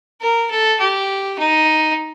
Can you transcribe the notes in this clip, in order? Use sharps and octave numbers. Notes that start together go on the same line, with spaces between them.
A#4
A4
G4
D#4